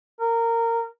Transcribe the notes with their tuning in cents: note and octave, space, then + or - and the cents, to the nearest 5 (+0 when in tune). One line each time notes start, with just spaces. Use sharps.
A#4 -15